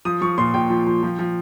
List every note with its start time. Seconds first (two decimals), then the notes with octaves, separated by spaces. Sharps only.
0.05 F3 D#6
0.21 F3 C#6
0.38 A#2 C6
0.54 A#2 G5
0.70 F3
0.87 F3
1.03 F3
1.19 F3